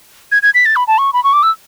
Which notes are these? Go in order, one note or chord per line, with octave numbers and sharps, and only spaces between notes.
G#6
G#6
B6
A6
B5
A5
C#6
B5
C#6
D6
E6